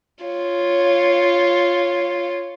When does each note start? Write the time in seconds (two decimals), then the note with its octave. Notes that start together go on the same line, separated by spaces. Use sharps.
0.24 F4 C#5